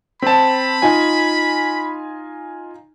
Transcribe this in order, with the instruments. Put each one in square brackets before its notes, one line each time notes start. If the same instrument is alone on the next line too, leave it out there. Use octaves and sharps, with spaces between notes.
[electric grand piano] C4 A5 [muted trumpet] B5
[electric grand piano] D#4 F4 G#5